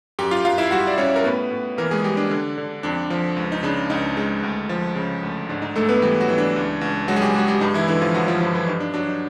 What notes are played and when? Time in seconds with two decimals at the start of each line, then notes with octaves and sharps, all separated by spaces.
0.19 F#2 G4 G5
0.31 F4 F5
0.44 F#2 F4 F5
0.58 E4 E5
0.71 G3 F#4 F#5
0.87 D5
0.98 G3 C#4 C#5
1.16 A#4
1.24 A2 B3 B4
1.51 A2
1.78 E3 A#3 A#4
1.91 G#3 G#4
2.04 G3 G4
2.17 D4
2.31 D3
2.58 D3
2.83 F2 D4
3.10 F3
3.37 C#2
3.52 D#4
3.63 C#3 D4
3.90 C#2 D#4
4.17 G#3
4.43 D2
4.69 F3
4.96 C#3
5.23 D2
5.49 G#2 D4
5.62 D#4
5.75 G#2 A3 A4
5.89 B3 B4
6.02 E3 G3 G4
6.21 F#3 F#4
6.29 E3
6.38 D4
6.56 C#2
6.81 C#2
7.08 F#3 G#3 F#4
7.16 G#4
7.21 G3 G4
7.35 G#3 F#4
7.48 G3 G4
7.61 G2 D#4
7.74 E3 E4
7.88 D3 E3 E4
8.01 F3 F4
8.15 G2 F#3 F#4
8.28 F3 F4
8.41 G2 F3 F4
8.54 E3 E4
8.68 G2 D#4
8.80 D4
8.94 F#3 D4
9.08 D#4